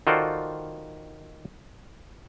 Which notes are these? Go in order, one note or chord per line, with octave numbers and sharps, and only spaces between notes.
D#3 F4 F#4 A4 C5 D5